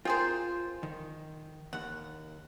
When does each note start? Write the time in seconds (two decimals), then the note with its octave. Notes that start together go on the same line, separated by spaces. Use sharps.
0.05 C4 F4 G#4 A#4 C5
0.83 D#3
1.73 D#2 F#5